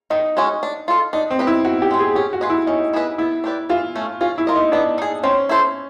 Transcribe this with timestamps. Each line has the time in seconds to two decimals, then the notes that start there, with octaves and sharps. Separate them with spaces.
0.10 D#3 D#4
0.37 G#3 C#4 F#4
0.63 D4
0.88 F4 A4
1.13 D4 D#4
1.31 C4
1.39 G4 B4 D#5
1.47 E4
1.65 D#3 F#4
1.82 G4
1.91 G#3 C4
1.99 G#4
2.15 C#4 G4
2.33 F#4
2.41 F4 G#4 B4 D#5
2.50 E4
2.67 C#4 D#4
2.93 E4 G#4 B4 D#5
3.18 B3 E4
3.44 D4 G4 B4 D5
3.69 E3 F4
3.96 A3 C#4
4.21 C#4 F4
4.38 E4
4.47 F4 A#4 D#5
4.55 D#4
4.72 B3 D4
4.98 D#4 G#4
5.24 C4 C#4
5.49 E4 A4 C5